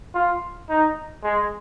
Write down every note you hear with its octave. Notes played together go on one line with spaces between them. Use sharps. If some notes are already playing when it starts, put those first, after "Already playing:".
F4
D#4
G#3